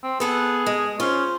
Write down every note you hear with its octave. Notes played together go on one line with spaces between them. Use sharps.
C4
B3 G#4 A4 F#5
G#3
C#4 F4 C5